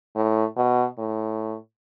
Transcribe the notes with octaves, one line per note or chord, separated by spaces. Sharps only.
A2
B2
A2